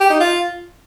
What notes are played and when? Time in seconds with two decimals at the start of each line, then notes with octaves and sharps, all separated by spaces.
0.01 G4
0.10 D#4
0.20 F4